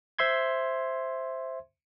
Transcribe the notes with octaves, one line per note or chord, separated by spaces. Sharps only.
C5 E5 C6 G#6